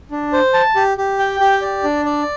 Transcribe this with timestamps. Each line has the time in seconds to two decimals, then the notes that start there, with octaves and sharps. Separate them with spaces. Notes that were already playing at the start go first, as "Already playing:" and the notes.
0.11 D4
0.33 C5
0.54 A5
0.76 G4
0.97 G4
1.19 G5
1.40 G4
1.62 D5
1.84 D4
2.05 D5